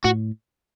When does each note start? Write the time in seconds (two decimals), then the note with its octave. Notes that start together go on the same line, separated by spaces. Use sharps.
0.05 A2 F#4